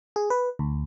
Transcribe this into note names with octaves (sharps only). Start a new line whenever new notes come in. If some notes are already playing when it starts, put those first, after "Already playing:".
G#4
B4
D2